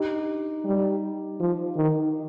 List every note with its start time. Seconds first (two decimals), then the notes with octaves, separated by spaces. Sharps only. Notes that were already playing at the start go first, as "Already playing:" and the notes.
Already playing: D#4 G4
0.64 G3
1.40 F3
1.76 D#3